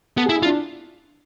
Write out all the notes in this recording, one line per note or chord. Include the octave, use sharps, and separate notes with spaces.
B3 A4
E4 G#4
E4
F4
D4